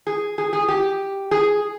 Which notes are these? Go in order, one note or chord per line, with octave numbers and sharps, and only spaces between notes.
G#4
G#4
G#4
G4
G#4